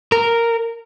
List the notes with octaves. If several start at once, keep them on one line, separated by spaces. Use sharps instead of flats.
A#4